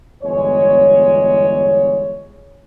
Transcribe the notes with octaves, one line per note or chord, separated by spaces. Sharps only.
G1 E2 G#3 C#5